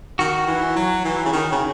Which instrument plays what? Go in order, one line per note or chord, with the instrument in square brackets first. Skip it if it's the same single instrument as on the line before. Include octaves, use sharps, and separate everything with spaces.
[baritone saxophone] D#3 [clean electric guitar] F#4
[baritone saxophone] E3
F#3
E3
C#3
D#3
C#3